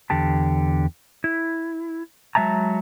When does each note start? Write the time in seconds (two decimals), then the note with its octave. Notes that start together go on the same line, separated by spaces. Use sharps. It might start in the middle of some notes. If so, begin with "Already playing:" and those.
0.10 E2 D3 G4 A5
1.24 E4
2.35 F#3 G#3 E5 A5 A#5